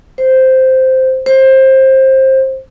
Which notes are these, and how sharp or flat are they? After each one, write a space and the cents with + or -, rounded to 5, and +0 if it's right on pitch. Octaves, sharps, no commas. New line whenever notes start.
C5 -5
C5 +20